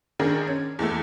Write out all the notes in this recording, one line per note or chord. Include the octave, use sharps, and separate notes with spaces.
G#1 D#3 D4 G#4 A#4
C#4
E2 E3 A3